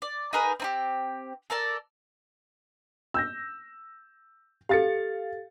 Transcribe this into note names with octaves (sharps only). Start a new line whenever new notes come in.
D5
D#4 G#4 A#4 B4
C4 D#4 G4
A4 A#4 D5 A5
E6 G6 A#6
G4 A4 F5 A6 C#7